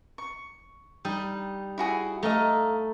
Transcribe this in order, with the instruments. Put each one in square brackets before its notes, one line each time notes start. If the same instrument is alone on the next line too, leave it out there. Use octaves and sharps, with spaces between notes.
[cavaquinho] C#6
[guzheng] G3 D#4
[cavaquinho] E4 F#4 G#4
[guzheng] A3 [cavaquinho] D#5 F5 A#5